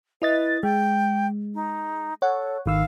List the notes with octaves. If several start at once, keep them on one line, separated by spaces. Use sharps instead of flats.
E4 B4 D#5 A6
G#3 G5
D#4
A4 C#5 F#5
G#1 D#3 F5 E6